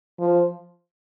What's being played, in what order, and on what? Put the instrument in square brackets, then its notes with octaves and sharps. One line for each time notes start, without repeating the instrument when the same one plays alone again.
[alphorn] F3